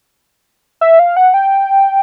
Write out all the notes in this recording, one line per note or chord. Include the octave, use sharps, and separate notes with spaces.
E5
F5
F#5
G5